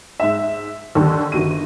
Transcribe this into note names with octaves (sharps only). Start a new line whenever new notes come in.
G#2 E5
D#2 D3 D#3 G3
G1 D#3 F#4 D#7